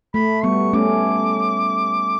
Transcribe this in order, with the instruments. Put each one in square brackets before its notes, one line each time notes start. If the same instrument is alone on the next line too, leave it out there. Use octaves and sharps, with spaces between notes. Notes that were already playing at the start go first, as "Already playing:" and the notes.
[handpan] A3 [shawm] B5
[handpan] G3 B3 [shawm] C#6
[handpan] A3 C#4 [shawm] D6